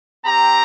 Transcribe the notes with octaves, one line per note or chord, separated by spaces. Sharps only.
C4 G4 A#5